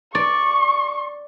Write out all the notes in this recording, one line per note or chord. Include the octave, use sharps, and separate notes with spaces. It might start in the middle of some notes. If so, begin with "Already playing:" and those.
D5 C#6